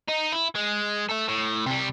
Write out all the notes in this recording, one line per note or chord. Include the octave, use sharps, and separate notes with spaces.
D#4
E4
G#3
A4 E5
A2
C3 G3